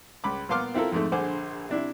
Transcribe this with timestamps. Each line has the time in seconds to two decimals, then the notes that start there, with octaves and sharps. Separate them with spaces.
0.24 C#2 B5 D6
0.49 A#2 B3 F5 C6 D6 F6
0.74 C4 E4 F4 A4 A#4
0.92 F2 G#2 A3
1.12 A#1 D3 G#4 C5 F#5 D6
1.69 C3 D4 E4